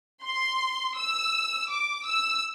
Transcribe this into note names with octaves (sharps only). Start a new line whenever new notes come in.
C6
E6
D6
E6